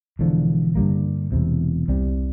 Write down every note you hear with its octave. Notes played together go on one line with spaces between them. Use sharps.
E1 E2 D3 F3
G2 D3 G3 A#3
E1 E2 C3
C2 C3 G3